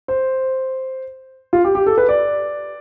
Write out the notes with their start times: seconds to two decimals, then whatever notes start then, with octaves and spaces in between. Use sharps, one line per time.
0.08 C5
1.53 F4
1.64 G4
1.75 G4
1.86 A4
1.98 B4
2.09 D5